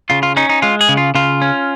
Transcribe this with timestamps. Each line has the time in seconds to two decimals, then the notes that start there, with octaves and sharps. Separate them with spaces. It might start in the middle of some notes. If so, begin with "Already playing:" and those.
0.10 C#3 F4
0.23 F4
0.37 C#4 D#4
0.49 D#4
0.62 G#3 F4
0.81 G#4
0.89 C#3
0.97 F4
1.15 C#3 F4
1.42 C#4